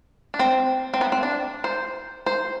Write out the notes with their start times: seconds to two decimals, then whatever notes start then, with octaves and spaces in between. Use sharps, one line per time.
0.34 D4
0.39 C4
0.94 C4
1.01 B3
1.12 C4
1.23 D4
1.64 C5
2.26 C5